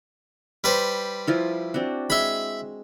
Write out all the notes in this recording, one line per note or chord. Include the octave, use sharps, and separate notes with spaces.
G3 B4 C5
F3 E4 F4
C4 D4 F#4
G#3 E5 B5 C6